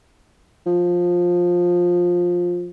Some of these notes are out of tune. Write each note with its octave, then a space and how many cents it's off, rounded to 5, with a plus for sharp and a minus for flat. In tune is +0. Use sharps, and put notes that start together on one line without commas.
F3 +15